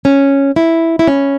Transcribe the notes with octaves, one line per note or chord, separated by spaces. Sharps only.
C#4
E4
E4
C#4